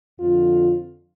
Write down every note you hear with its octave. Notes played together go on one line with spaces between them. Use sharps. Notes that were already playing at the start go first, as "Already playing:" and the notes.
F2 D3 F3 F4